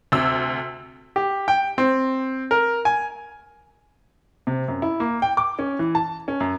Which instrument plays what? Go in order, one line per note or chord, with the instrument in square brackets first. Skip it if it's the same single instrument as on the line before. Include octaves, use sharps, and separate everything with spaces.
[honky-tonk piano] D2 C3 E6
[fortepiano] G4
G5
C4
A#4
G#5
[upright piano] C3
F#2
E4
A#3
G5
D6
C#4
E3
A5
C#4
F#2